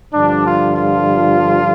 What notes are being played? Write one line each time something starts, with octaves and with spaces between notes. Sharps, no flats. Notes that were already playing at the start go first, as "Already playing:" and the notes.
G2 D3 F3 D4
F4
F4